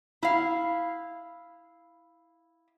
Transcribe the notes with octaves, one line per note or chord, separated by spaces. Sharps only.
E4 F5